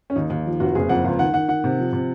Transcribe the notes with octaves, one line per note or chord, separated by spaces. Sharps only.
C#4
D#2 D#4
D#2
F3
F1 F#4
F#1 G#4
F2 F#5
C#2
D#3 F#5
D#3 F#5
D#3 F#5
C3
F3
C3